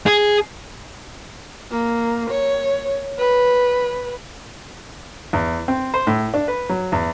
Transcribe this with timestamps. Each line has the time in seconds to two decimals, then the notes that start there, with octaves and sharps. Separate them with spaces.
0.06 G#4
1.71 A#3
2.30 C#5
3.18 B4
5.33 E2
5.68 C4
5.94 C5
6.07 A2
6.34 D4
6.48 B4
6.69 F#3
6.92 E2